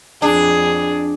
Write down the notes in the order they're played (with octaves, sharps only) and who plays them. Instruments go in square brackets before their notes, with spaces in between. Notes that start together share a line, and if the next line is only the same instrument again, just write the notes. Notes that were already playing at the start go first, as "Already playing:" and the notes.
[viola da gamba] F2 G#4 [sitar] D4